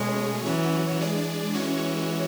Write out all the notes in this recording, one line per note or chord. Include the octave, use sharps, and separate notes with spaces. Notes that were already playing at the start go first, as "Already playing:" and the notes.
Already playing: B2 G#3 A3 C#4 G#4 C#5
E3 F#3 C#4 F#4 C#5
G#3 D4 G#4 D5
E3 G#3 C#4 F#4 C#5